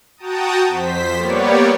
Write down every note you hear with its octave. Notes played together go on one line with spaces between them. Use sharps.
F#4 G5 A5 A#5 D#6
F2 C5 B6
G3 A#3 B3 G4 C#5 D5